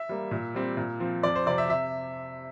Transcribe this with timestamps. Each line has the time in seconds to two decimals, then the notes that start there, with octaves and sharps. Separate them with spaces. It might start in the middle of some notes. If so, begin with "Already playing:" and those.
Already playing: E5
0.09 G3 A#3
0.31 A#2
0.55 G3 C4
0.77 A#2
1.00 F3 C4
1.23 F2 D5
1.35 C5
1.46 C3 F3 C4 D5
1.58 E5
1.69 C3 E5